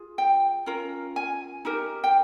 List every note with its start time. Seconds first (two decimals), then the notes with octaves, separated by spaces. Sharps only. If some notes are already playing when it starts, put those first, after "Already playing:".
Already playing: F4 G#4
0.18 G5
0.66 C#4 F4 A#4
1.16 G#5
1.65 D#4 G4 A#4
2.04 G5